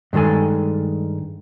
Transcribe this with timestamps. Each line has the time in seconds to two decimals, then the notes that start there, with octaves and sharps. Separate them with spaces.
0.13 G2 D#3 G#3 A4 G#5